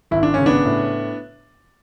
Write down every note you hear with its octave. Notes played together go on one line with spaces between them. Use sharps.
G#1 E4
D4
C#3 C#4
B3 D4
A2